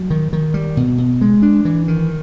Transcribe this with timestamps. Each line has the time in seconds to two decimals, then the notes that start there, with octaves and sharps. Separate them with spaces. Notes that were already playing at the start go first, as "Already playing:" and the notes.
Already playing: F#3
0.10 D#3
0.33 D#3
0.54 G3
0.77 B2
0.98 B2
1.21 G#3
1.42 D4
1.65 E3
1.88 D#3